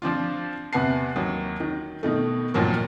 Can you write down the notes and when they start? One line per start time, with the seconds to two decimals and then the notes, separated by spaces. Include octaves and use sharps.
0.02 F3 C4 D4 F4
0.73 E2 C3 B4 F#5 A5 C7
1.16 D#2 F#3
1.60 D#3
2.03 B2 D#3 A3
2.54 D#2 A#2 F3 F#3 A#3